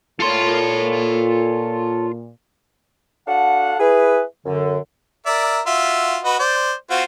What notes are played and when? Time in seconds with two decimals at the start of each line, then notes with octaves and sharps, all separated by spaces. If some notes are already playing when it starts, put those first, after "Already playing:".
0.20 A#2 F4 A4 C#5 C6
3.28 D4 F#4 A4 F5 F#5
3.80 E4 G#4 B4
4.46 F#2 D3
5.26 A#4 D5 E5
5.66 F4 F#4 E5
6.24 F#4 B4 D#5
6.39 C5 D5
6.91 C4 F4 F#4